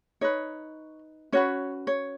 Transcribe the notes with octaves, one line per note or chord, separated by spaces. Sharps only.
D#4 B4 C#5
C#4 F#4 B4 C#5
C#5